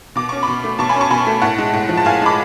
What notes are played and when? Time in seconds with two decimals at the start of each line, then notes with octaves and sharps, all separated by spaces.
0.16 B2 D6
0.29 C#4 C#6
0.43 B2 B5 D6
0.64 A3
0.79 B2 A5 C#6
0.89 G#5 B5
0.96 C#4
1.01 A5 C#6
1.10 B2 G#5 B5
1.26 A3
1.42 A2 F#5 A5
1.58 G#3
1.73 A2
1.89 F3
1.97 A5
2.05 A2 F5 G#5
2.21 G#3 B5 D6